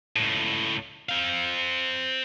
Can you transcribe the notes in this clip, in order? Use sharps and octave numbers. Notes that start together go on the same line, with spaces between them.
C#2 A2
C4 F5